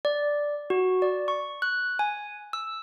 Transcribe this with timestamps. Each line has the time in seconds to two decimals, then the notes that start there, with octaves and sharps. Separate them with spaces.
0.05 D5
0.70 F#4
1.02 D5
1.28 C#6
1.62 F#6
1.99 G#5
2.53 E6